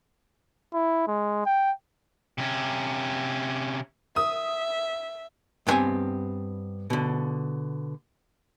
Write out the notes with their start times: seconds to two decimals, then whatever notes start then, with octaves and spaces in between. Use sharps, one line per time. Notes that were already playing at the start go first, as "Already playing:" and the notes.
0.74 E4
1.08 G#3
1.46 G5
2.38 C3 C#4
4.16 E5 D#6
5.67 G2 A#2 B3 C4 G#5
6.90 B2 D3